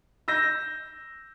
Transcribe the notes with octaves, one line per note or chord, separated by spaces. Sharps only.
E6 G6 A#6